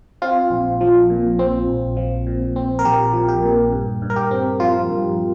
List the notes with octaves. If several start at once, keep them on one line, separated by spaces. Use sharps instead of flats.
C4 F4
A#1
F3
A#2
C4
A#1
F3
A#2
C4
A#4
A#1 G4
F3
G4
A#2
G2
G2
A#4
G4
C4
F3 F4
G2